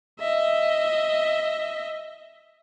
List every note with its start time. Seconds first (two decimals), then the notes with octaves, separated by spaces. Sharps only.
0.19 D#5 E5